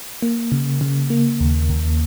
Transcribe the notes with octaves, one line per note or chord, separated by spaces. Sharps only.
A#3
C#3
C#3
A#3
D#2
D#2